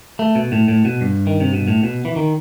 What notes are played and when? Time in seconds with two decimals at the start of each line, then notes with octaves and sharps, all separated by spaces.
0.19 A3
0.35 B2
0.52 A2
0.68 A2
0.85 B2
1.01 G2
1.27 D#3
1.40 C3
1.53 B2
1.68 A2
1.83 B2
2.05 E3
2.16 D#3